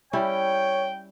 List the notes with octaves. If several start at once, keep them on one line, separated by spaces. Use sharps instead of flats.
G3 C#4 E4 C#5 G5